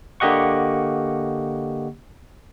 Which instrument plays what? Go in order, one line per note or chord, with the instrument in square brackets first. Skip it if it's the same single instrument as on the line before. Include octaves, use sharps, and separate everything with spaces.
[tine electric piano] D3 A#3 G4 D#5 F#5 C#6